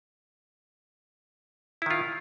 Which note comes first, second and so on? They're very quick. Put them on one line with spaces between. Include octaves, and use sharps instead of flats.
E4 D#3 F4